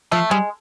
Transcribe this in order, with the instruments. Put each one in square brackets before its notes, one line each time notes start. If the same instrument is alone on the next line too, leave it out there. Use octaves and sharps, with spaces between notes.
[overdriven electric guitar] F3 [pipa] A3
[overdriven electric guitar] G3 [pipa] G#3